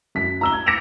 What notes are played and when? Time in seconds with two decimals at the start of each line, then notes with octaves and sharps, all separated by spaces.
0.15 F#2 B6
0.41 A#5 E6 G7
0.53 G#6
0.66 D6 A#6 C#7 D7 E7 F7